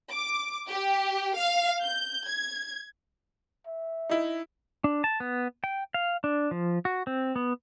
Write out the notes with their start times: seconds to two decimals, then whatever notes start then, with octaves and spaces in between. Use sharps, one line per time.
0.12 D6
0.69 G4
1.37 F5
1.81 G6
2.27 G#6
3.67 E5
4.09 D#4 E4
4.84 D4
5.04 A5
5.20 B3
5.64 G5
5.94 F5
6.24 D4
6.51 F3
6.85 F#4
7.07 C4
7.36 B3